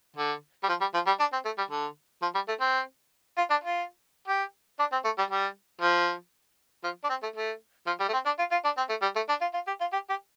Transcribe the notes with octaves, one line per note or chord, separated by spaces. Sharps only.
D3
G3
F3
G3
F3
G3
D4
C4
A3
G3
D3
F3
G3
A3
C4
F4
D4
F4
G4
D4
C4
A3
G3
G3
F3
F3
D4
C4
A3
A3
F3
G3
A3
C4
D4
F4
F4
D4
C4
A3
G3
A3
D4
F4
F4
G4
F4
G4
G4